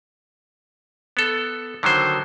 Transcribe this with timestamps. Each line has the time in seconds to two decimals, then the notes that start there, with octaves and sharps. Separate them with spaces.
1.17 B3 A4
1.83 D3 D#3 F#3 C5